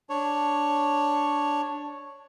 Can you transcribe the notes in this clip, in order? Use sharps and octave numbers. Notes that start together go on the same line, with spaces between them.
D4 C#5